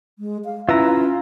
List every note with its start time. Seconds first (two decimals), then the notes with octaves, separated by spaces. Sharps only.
0.19 G#3
0.45 F5
0.69 C#4 E4 F4 B4 A#5 E6